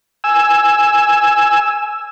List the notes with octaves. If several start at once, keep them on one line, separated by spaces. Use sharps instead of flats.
G#5 E6